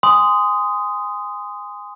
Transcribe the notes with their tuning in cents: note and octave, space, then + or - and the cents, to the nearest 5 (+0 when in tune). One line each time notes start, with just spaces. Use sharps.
G#5 -20 C6 -20 D#6 +0